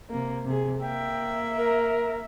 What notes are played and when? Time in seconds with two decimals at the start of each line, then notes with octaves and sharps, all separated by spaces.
0.10 C3 A#3
0.45 C3 G#4
0.80 A#3 E5 G5
1.57 A#4